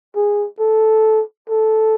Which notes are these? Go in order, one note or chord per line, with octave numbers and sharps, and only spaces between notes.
G#4
A4
A4